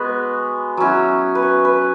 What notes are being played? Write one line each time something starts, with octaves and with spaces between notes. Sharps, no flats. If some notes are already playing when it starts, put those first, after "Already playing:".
Already playing: G#3 B3 F#4 B4
F#3 C#4 E4
B4
C#5
B4